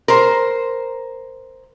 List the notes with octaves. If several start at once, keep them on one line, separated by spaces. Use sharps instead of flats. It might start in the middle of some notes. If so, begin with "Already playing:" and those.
A#4 C5